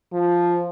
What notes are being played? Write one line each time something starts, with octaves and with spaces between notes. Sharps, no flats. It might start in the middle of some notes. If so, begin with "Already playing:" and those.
F3